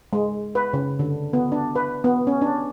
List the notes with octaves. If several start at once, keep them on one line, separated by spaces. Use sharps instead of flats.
G#3
B4
C#3
D3
B3
D4
B4
B3
C#4
D4